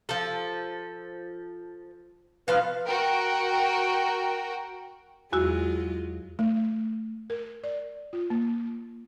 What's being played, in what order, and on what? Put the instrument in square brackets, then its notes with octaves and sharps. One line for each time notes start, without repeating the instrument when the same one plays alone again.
[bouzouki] F3 A4
[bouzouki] B2 F3 F5 [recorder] B4
[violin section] F#4 A#4 G5
[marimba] E2 F#4 E6 [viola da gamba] F#3 G#3 F4
[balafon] A3
A#4
D5
F4
A#3